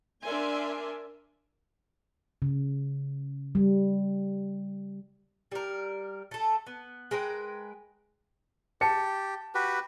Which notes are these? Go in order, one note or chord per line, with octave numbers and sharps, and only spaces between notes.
D4 A#4 D5 E5 G#5 C6
C#3
G3
G3 A#4
A3 A4
B3
G#3 A#4 B4 G5
G4 A5 C#7
F#4 G4 B4